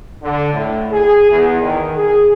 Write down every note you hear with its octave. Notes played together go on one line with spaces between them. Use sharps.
D3
A2
G#4
E2
D#3
G#4